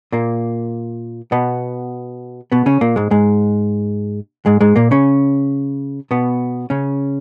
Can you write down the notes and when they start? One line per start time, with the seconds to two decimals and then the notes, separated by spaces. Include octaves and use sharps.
0.12 A#2 A#3
1.32 B2 B3
2.52 B2 B3
2.66 C#3 C#4
2.81 A#2 A#3
2.96 G#2 G#3
3.11 G#2 G#3
4.46 G#2 G#3
4.61 G#2 G#3
4.76 A#2 A#3
4.91 C#3 C#4
6.11 B2 B3
6.70 C#3 C#4